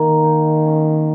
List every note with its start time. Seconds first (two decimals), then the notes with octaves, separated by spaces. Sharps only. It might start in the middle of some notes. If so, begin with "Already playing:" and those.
Already playing: D#3 A#3
0.24 D#4
0.65 C#4